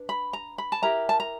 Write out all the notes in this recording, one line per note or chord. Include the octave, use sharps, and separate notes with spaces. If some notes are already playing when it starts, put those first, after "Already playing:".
Already playing: D4 B4
B5
A#5
B5
A5
E4 G4 A#4 A#5
A5
A#5